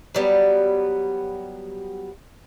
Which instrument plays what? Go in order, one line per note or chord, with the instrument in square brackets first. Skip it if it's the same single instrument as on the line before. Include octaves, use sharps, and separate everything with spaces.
[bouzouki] F#3 G3 B3